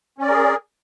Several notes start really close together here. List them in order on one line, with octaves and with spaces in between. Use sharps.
C#4 D5 A#4 G#4